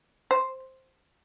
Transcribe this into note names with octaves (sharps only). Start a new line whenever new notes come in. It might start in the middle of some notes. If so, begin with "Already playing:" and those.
C5